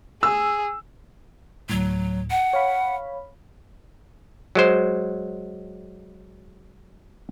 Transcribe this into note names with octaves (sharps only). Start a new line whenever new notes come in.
G#4 E6
D2 A2 F#3
F#5
C#5 F5 B5
F#3 G#3 C5